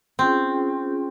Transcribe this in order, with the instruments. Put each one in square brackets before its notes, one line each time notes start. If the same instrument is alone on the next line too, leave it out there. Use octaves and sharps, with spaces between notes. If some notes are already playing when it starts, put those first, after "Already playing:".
[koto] C4 [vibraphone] C#4 F4 G#4